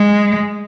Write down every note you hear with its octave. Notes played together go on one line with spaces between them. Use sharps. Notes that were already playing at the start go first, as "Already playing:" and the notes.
Already playing: G#3